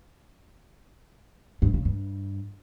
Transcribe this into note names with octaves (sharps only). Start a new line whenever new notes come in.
G2
C#3
G2